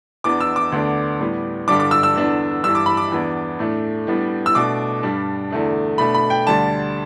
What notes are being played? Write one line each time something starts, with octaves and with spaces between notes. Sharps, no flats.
E2 E3 B3 D4 D6
E6
D6
D2 D3 B3 D4
A2 G3 B3
G2 D3 G3 D4 D6
D6
E6
E6
E2 D3 B3 D4
G2 E3 G3 D4 E6
D6
B5
D6
E2 E3 B3 D4
A2 A3 D4
A2 G3 B3 D4
E6
B2 A3 D4 D6
G2 G3 D4
E2 D3 A3 D4
B2 A3 D4 B5
B5
G5
D2 D3 G3 D4 A5